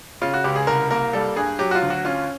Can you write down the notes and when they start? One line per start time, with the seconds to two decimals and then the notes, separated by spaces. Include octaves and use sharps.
0.22 C#3 F4
0.34 F#4
0.44 C#2 G4
0.56 G#4
0.67 C2 A#4
0.90 A#3 A#4
1.13 G3 A4
1.36 G2 G#4
1.59 F#3 G4
1.71 F#4
1.75 F4
1.82 D2
1.90 F#4
2.05 C#4 F4